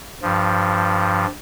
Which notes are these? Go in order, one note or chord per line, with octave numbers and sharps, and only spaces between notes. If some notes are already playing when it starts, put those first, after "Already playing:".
G2 F3